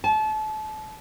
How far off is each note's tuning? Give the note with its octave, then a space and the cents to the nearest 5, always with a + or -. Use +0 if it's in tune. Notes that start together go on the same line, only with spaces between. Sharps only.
A5 -30